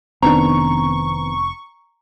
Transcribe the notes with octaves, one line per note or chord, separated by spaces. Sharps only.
F1 D#3 B3 C4 D4 A#5 C#6